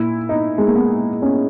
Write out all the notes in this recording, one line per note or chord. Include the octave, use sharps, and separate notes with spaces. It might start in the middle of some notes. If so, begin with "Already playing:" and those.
Already playing: A#2 E4
D#4
G#3
A#3
B3
C#4